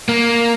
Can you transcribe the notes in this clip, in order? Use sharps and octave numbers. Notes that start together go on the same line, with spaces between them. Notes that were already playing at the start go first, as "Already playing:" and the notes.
A#3